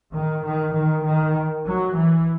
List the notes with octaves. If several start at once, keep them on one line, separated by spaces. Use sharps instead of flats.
D#3
D#3
D#3
D#3
F#3
E3